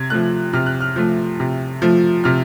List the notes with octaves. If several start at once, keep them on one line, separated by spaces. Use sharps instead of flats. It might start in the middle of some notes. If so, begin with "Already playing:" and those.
Already playing: C3 G#6
F3 A3 F#6
C3 F6
F#6
F6
F3 A3
C3
F3 A3
C3 F6